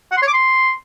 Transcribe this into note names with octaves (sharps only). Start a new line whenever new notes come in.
F#5
C6
C#5
D6
C6